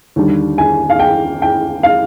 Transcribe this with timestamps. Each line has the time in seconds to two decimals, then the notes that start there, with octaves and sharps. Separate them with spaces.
0.16 D#2 D3 G3
0.58 G#5
0.90 F5
0.99 G5
1.42 G5
1.83 F5